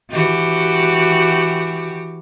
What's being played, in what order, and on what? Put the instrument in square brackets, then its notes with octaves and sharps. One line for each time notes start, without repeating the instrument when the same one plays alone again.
[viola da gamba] E3 F#4 G4